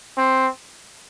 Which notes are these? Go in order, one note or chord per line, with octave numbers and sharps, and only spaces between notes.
C4